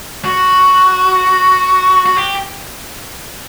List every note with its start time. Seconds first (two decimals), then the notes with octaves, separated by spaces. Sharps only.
0.25 F#4
2.06 F#4
2.17 G4